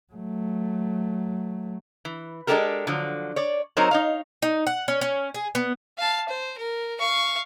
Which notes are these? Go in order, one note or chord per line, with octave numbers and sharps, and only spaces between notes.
F#3 A3
E3
G#3 D4 D#4 G4 A4 A#4
D3 F3 F#3
C#5 D5
F#3 C4 D#4 A#4 C5 C#5
D#4 C#5 F5
D#4
F#5
C#4
C#4
G#4
B3
F5 A5
C5
A#4
F5 C#6